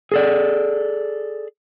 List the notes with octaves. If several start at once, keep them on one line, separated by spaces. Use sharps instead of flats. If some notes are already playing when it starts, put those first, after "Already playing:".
G#4 A4 D5